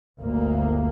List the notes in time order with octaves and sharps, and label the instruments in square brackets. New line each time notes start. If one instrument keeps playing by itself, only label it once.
[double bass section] G1 D2 A#3